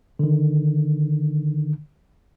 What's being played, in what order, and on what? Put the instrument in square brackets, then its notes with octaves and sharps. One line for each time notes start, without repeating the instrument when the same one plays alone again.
[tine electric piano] D3 D#3